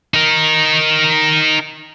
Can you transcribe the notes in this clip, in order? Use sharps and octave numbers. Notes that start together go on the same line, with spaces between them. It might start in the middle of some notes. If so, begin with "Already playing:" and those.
D#4 A#4